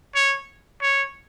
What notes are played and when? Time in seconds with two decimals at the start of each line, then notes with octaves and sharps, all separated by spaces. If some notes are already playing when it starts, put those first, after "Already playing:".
0.15 C#5
0.82 C#5